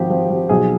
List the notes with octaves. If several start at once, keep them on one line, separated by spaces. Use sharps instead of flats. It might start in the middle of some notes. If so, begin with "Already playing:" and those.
Already playing: G#1 F3 G4
F3
F3
B1 G#4